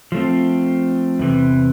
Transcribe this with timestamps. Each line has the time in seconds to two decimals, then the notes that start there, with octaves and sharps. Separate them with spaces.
0.12 F3 A3 C4
1.19 E2 C3 E3